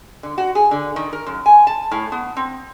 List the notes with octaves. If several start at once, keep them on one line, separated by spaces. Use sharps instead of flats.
D3
F#4
G#4
D3
D#3
A#4
F#2
G#5
A5
A2
B3
C4